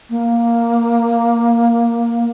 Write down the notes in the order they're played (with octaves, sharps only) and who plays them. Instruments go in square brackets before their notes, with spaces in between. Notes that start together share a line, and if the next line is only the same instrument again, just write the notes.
[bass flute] A#3